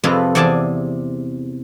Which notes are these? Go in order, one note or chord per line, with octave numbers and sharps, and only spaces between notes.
F2 C3 F4 G#4 A4 B4
E2 C3 D5 G#5 A5